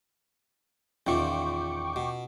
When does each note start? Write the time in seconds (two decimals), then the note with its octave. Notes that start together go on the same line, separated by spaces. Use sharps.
1.07 E2 A#2 D#3 C#4 F4 G5 C#6 D6
1.96 B2